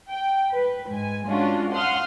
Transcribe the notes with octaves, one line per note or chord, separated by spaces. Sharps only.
G5
B4
G#2 G#5
G#3 C#4 D4 F4 F#4
F5 F#5 C6 D#6 F6